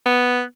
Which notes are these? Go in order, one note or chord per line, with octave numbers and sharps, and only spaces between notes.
B3